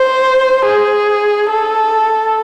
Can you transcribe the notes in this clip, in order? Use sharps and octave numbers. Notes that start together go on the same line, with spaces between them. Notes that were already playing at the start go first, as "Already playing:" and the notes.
Already playing: C5
G#4
A4